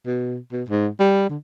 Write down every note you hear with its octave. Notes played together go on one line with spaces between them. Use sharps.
B2
B2
G#2
G3
D3